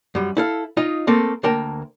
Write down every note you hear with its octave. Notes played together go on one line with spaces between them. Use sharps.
F#2 G3
E4 A4 F5
D#4 F4 D#5
A3 A#3 C4 A4
D2 A#3 A#4 G5 A5